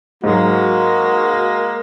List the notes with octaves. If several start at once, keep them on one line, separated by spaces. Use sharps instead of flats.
G#2 F#3 G#3 A#3 F#4